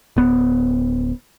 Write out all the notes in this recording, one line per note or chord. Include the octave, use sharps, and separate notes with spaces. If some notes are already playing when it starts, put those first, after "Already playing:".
D1 B3